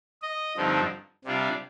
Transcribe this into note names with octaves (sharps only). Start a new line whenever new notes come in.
D#5
G2 D3 F3 C4 D#4
C3 G3 D4 F4